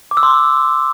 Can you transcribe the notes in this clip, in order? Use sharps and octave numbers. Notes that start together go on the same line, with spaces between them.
D6
E6
C6